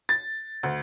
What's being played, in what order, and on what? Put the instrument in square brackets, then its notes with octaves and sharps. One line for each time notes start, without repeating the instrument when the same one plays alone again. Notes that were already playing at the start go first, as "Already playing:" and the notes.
[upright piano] A6
D2